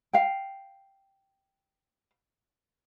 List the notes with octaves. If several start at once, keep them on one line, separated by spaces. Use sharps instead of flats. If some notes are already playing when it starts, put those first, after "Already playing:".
F5 G5